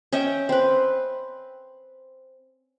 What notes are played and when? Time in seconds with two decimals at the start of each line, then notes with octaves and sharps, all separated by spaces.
0.12 C#4 D#5 E5 G5
0.49 C4 B4